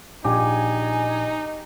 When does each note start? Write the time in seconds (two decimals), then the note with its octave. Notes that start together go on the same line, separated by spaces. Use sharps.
0.24 A#1 D#4 G4 G#5